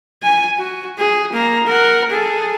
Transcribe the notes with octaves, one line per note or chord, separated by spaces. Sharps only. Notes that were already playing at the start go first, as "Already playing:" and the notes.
G#5
F#4
G#4
A#3 A#5
A#4 F#5
G#4 A4